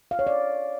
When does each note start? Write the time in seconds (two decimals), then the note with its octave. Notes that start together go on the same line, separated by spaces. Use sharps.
0.11 F5
0.19 C#5
0.27 D5